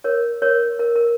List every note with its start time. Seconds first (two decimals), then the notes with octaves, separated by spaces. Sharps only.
0.04 A#4 C#5
0.42 A#4 C#5
0.79 A#4
0.96 A#4